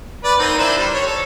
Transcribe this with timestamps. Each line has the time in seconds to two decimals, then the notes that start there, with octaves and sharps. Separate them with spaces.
0.24 B4 D5
0.39 A#3 C4 D#4
0.58 D4 E4 C5
0.78 G3
0.94 C#5
1.06 A4